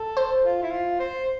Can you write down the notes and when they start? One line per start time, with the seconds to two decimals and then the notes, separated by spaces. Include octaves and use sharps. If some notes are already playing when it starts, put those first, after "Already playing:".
Already playing: A4
0.17 C5
0.44 F4
0.62 E4
0.71 F4
0.99 C5